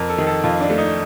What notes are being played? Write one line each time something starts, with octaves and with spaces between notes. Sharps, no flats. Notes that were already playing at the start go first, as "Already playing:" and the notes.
Already playing: F2 A#4
A4
D#3
A4
F2 F4
D4
A3
D#4